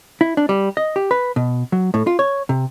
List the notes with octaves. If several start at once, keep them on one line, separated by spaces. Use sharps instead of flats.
E4
D4
G3
D#5
G4
B4
B2
F#3
A2
F4
C#5
C3